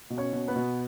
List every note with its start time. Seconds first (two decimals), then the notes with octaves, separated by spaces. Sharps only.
0.10 B2
0.18 C#4 C#5
0.33 B2
0.48 B3 B4
0.56 B2